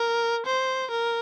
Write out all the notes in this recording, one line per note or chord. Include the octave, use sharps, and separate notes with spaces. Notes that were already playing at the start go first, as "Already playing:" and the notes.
Already playing: A#4
C5
A#4